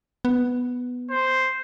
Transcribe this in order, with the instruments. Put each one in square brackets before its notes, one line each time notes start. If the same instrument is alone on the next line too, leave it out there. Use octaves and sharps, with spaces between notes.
[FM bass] B3
[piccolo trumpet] C5